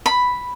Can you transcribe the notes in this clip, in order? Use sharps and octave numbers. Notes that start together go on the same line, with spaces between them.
B5